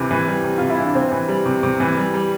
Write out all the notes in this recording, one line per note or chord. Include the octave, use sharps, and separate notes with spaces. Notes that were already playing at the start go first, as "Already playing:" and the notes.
Already playing: C3 E3
E3
G3
C3
C3 F4
E4
E3 D4
C3 C4
E3
G3
C3
C3
E3
G3
G3